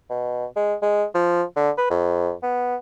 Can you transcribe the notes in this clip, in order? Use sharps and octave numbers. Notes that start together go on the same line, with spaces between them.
B2
G#3
G#3
F3
D3
B4
F2
B3